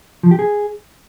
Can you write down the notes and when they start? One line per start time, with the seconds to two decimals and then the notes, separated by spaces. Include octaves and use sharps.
0.23 F3
0.31 G4
0.39 G#4